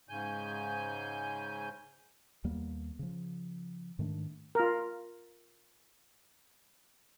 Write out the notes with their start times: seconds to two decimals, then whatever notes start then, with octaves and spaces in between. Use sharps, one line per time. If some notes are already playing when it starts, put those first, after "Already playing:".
0.09 G#2 C#3 G#5 G6
2.44 D#2 G3 A#3 B3
2.99 C#3 F3
3.99 G#2 D#3 A3 D4
4.55 F4 A#4